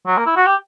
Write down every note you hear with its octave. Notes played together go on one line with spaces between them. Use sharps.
F#3
A#3
E4
F#4
G4